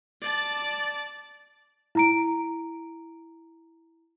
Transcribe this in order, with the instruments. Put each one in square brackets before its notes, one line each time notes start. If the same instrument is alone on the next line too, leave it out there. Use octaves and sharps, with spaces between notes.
[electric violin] D5 A5
[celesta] E4 A#5 D7